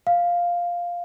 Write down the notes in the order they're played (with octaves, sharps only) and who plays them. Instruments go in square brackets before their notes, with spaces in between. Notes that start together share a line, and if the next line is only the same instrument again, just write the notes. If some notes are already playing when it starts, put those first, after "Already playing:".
[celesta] F5